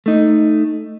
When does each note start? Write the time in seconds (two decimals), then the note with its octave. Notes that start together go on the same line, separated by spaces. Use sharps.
0.06 A3 D#4